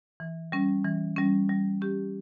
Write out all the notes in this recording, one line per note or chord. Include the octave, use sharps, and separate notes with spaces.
E3
G3 C#4
E3
G3 C#4
G3
C#4 G4